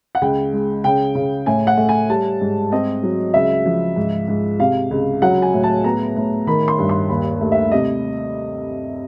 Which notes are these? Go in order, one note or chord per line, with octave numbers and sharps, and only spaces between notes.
F#5
C#2 G5
G#3
C#3 G5
C#3
A2 G#5
F#5
A3
G#5
G3 A5
G#2
C4 D#5
F#3
C#2 E5
F3
G#2
G#2
C3 F5
C#2
F#3 F#5
G#5
A2
A5
B3 A#5
A2
D#3 B5
C6
G2
C6
D#2 B5
A3
E5
C3 D#5